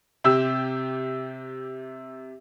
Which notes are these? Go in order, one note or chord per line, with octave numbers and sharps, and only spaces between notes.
C3 G4 E6